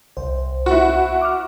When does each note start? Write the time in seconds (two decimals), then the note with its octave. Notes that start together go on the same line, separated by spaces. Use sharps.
0.17 C2 C5
0.66 E4 F#4
1.22 D6 F6